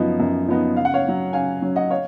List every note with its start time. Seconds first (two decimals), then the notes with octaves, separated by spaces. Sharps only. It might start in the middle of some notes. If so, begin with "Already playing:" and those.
Already playing: F#2 F3 B3 D#4 D#5
0.20 F#2
0.48 F3 B3 D#4
0.76 C#3 F5
0.85 F#5
0.94 C#5 F5
1.05 F#3 C#4
1.33 C#3 F5 G#5
1.62 F#3 C#4
1.76 D#5 F#5
1.91 C#5 F5